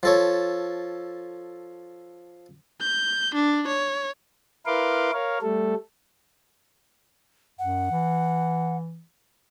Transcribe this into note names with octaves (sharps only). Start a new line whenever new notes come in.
F3 A4 C#5
G6
D4
C#5
E4 A#4 B4 F5 C6 D6
A#4 C#5 F5
G3 A3 A4
F#2 F#5
E3